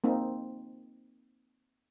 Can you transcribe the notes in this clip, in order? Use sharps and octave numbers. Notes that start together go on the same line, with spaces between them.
A#3 C4 D#4